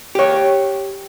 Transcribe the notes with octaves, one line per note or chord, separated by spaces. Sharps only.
G4 C#5